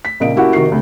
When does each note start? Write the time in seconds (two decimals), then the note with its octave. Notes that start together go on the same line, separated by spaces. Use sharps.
0.05 B6
0.20 A#1 C#3 A#4 D#5 F5 D7
0.36 A#3 C#4 E4 F#4 G4 F#5
0.53 C3 D#3 F#4 A#4 C7
0.68 D2 C3